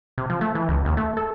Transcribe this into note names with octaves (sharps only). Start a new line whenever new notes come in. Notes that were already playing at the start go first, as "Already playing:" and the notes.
C3
F3
A3
E3
C#2
D#2
A3
A4